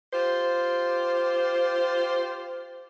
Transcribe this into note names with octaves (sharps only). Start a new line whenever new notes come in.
F4 G4 C5